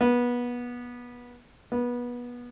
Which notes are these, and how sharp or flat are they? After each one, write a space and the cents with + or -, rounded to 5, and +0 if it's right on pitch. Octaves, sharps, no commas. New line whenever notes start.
B3 -25
B3 -25